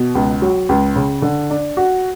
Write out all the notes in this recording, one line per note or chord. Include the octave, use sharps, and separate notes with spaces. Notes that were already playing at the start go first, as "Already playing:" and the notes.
Already playing: B2
C#2
F#3
C#2
C#3
D3
D4
F#4